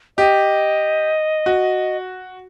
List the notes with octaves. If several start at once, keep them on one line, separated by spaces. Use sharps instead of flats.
G4 D#5
F#4